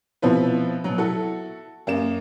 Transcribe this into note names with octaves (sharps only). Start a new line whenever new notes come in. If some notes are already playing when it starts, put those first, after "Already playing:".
B2 F3 B3 C4 E4 B4
B2 F#3
E4 F#4 A4
F#2 A#3 E7